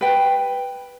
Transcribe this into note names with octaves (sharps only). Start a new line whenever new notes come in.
B4 G5